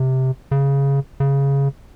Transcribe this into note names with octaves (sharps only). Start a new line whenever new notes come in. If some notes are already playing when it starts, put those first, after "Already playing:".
Already playing: C3
C#3
C#3